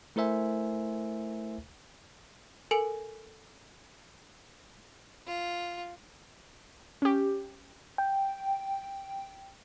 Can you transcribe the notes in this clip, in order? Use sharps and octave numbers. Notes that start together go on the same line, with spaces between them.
A3 E4 A#4 C5 E5 G#5
A4 A#4 G#5 C#7 D7 F#7
F4
C#4 G4
G5